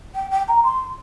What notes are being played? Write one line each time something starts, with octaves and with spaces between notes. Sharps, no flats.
G5
G5
A#5
C6